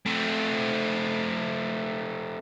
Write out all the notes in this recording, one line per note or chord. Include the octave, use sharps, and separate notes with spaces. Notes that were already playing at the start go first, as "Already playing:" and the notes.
A3 C4